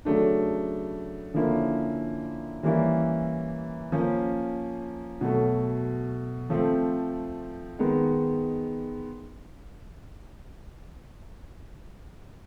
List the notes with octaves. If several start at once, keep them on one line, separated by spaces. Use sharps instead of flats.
C#3 F#3 A3 D4
D3 F3 A#3 C#4 E4
E3 G3 A#3 C#4 E4
F3 A#3 C#4
B2 F#3 A3
F3 A3 C4
D#3 G#3 B3